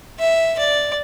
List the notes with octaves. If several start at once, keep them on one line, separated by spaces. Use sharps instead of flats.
E5
D5